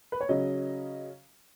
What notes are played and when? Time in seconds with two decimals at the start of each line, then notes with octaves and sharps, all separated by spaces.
0.12 B4
0.21 C#5
0.29 C#3 F#3 C#4 D#5